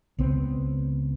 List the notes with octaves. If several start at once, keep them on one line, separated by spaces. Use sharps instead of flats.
C#2 B3 C4